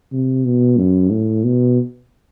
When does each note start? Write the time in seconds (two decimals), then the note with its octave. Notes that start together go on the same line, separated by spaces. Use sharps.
0.12 C3
0.45 B2
0.78 F#2
1.11 A2
1.44 B2